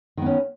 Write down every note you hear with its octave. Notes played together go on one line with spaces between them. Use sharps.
D#3 B3 C#4